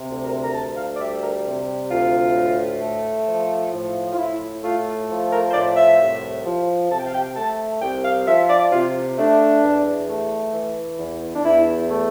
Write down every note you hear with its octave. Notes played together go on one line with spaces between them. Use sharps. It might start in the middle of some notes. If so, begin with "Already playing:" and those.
Already playing: C3
D2
A#4
A#5
D2 A5
F5
D5
G3 E5
A#4
C3
D2 F4
A2
A3
F3
A2
F4
A2 E4
A3 F4
F3
A#4
C5
A2 D5
E5
C2
F3
C3 A5
G5
F5
G5
A3 A5
C2 G5
F5
F3 E5
D5
C3 F4
A3 D4
E2
A3
E3
E2
D4
E2 E4
A3